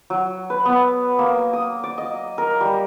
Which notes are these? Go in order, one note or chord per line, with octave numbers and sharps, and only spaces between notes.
F#3
B4
B3
A#3
D#6
D5
D#5
A#4
G3